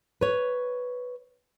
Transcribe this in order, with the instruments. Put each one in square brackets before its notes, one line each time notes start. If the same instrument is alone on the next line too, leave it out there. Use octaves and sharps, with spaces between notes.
[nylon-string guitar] B4 C#5